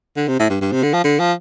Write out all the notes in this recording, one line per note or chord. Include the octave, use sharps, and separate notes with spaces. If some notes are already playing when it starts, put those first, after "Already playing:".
D3
C3
A2
G2
G2
C3
D3
F3
D3
F3